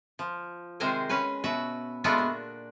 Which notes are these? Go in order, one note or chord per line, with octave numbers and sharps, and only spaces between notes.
F3
C3 D#3 G#3 A#4 C5 G#5
C#4 B4 G#5
B2 F#4 B4 E5
G#3 A3 B3 D4 F4 F#4
A#2